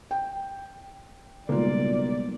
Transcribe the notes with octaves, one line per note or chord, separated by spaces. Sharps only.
G5
B1 C#3 G3 G#3 A#3 F4 D5